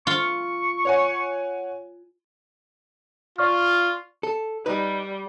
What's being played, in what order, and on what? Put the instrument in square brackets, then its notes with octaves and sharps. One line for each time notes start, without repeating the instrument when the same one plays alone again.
[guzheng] F4 [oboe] C#6
[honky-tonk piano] C#5 F#5 G#5
[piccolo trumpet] F4 [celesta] D5 C#6 F6
[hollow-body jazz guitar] A4
[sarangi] G3 [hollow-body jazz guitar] D#4 B4